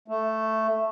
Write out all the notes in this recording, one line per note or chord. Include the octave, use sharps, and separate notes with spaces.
A3